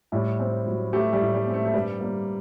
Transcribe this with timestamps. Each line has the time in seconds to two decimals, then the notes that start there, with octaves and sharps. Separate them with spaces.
0.12 A2 G3
0.39 C4
0.67 F#3
0.93 A3 G4
1.13 G3
1.21 A2
1.34 G3
1.47 C4
1.53 A3
1.66 A3
1.73 G2 G3
2.01 A#3